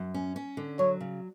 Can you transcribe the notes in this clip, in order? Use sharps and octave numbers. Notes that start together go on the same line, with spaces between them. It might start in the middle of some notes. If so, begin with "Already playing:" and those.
Already playing: F#2
C#4
C#4
D3
F#3 C#5
C#3